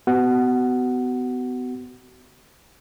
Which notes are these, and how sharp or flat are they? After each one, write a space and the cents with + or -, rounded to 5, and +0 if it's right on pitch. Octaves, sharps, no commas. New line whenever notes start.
B3 +30 F#4 +35 F#5 +5